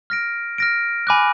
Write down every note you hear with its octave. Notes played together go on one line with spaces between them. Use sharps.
F6 A#6 D7
F6 A#6 D7
G#5 B5 D6 F#6